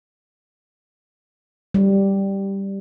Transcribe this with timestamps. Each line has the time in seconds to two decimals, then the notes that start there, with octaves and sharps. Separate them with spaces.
1.74 G3